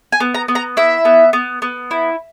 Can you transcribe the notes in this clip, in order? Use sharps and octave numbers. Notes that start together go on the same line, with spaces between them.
G#5
B3
A#5
B3
A#5
E4 E5
B3
B3
B3
E4